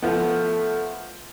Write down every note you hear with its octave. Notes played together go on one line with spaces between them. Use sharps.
F3 A3 B3